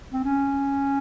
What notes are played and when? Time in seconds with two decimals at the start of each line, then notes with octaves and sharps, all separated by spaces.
0.13 C4
0.24 C#4